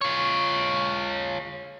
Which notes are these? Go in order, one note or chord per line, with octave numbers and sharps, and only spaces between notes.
F4 C#5